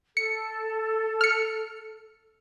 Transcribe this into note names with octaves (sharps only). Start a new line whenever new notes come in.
A4 C#7
F6 C#7